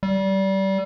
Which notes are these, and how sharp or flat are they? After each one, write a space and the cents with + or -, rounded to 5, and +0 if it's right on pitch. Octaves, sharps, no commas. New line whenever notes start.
G3 -25